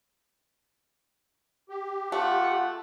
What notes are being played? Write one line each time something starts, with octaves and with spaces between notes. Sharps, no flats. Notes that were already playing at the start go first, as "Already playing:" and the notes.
G4
A3 F4 F#5